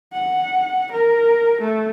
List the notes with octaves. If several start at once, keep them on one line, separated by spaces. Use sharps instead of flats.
F#5
A#4
A3